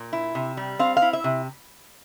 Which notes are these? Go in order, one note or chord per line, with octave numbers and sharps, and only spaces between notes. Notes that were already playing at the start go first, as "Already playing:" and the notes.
Already playing: A#2
E4
C3
G3
C4 F5
F5
E4
E5
C3